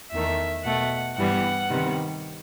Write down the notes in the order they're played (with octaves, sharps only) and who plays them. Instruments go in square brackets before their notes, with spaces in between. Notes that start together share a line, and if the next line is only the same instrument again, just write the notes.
[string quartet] E2 D#3 A3 E5
B2 A3 F#5
G2 E3 G3 B3 F#5
C3 D#3 G3 B3